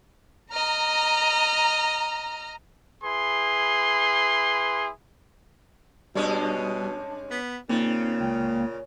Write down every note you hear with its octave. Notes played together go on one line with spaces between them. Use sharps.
D#5 A#5 F6
E4 G#4 B4 C6
G2 B2 G3 G#3 C#4 A5 D#6
B3 B6
A#2 C#3 A#3 C4 D#4 A6
C#2 G5